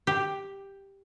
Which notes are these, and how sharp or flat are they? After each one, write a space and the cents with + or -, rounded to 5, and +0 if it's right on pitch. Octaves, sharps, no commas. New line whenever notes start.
G4 +5